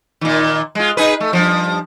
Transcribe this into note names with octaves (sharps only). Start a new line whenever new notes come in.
A#2 D#3
G#3 F4
D#4 G#4 B4
A3
G2 B2 F3